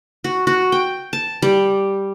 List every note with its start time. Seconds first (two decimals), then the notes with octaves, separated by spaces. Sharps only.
0.24 F#4
0.47 F#4
0.72 G5
1.13 A5
1.42 G3